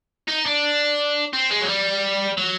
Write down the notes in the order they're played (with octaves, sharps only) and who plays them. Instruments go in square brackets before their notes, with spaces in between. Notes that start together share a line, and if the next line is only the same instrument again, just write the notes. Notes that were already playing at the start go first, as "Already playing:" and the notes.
[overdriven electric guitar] D#4
D4
C4
G#3
F#3
G3
F#3